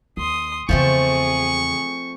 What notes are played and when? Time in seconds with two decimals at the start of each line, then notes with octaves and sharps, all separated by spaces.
0.17 D#2 C6 D#6
0.69 E2 C#3 F3 A3 C4 G#4 C#6